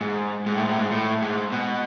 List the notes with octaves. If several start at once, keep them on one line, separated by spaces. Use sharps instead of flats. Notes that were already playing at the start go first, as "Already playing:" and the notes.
G#2
G#2
A2
G#2
A2
G#2
A2
G#2
B2